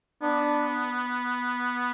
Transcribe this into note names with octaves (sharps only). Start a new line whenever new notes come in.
B3 D4